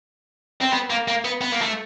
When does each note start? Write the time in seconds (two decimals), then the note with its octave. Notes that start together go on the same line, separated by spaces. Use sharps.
0.62 C4
0.73 B3
0.90 A#3
1.08 A#3
1.25 B3
1.41 B3
1.52 A#3
1.62 A3